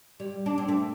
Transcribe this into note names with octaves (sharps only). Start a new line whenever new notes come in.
G3
D4
C4
A3